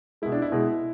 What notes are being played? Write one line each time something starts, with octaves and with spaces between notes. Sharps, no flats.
B2 G#3 E4
D4
E4
B2 G#3